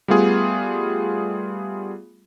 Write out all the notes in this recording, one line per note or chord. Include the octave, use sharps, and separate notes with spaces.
G3 A3 B3 F4 G#4